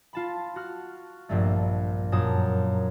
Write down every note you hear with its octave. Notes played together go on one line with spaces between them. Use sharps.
F4 A5 B5
F#4 F6
A#1 G2 A3
A#3
F#2 A#2 A5 D#6